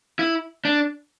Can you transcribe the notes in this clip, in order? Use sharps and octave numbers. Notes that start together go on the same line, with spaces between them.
E4
D4